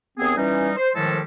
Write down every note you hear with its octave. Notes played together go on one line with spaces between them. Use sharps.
D#2 B3 C4 G#4
E3 G3 C#4 D#4
C5
A2 D#3 F3 G3 G#3 A4